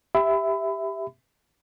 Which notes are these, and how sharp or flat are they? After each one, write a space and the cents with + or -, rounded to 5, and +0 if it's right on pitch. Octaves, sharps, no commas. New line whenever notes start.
G4 +5 E5 +0 B5 +25